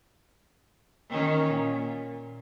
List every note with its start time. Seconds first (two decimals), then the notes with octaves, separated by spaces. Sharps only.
1.10 D#3 C#4
1.49 A#2